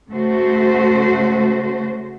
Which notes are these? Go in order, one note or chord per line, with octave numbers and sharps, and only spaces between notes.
C#3 A3 F#4 C5